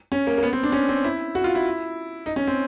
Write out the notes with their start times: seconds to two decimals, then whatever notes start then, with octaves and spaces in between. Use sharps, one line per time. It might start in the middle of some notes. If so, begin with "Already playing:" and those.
0.12 C#4
0.27 A#3
0.38 A#3
0.43 B3
0.53 C4
0.63 D4
0.72 C#4
0.89 C4
1.04 E4
1.35 F#4
1.44 F4
1.55 E4
2.26 D#4
2.36 C#4
2.47 C4